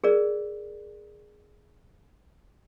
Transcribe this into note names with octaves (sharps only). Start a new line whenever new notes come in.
G#4 A#4 D5